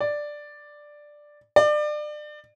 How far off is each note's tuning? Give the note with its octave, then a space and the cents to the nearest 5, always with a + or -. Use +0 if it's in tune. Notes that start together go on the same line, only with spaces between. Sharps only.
D5 +5
D5 +30